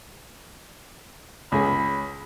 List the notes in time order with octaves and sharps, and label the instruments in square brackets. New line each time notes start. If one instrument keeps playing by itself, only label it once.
[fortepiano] C#2 G#4 [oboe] B5